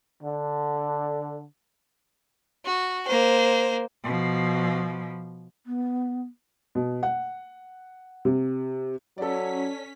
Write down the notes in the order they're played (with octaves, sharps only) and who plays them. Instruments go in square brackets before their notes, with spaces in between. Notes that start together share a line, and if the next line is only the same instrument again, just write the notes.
[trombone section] D3
[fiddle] F#4
A#3 C5
[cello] B2 F3
[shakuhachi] B3
[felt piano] B2
F#5
C3
[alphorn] F#3 [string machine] C#4 B6 [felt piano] A4 D5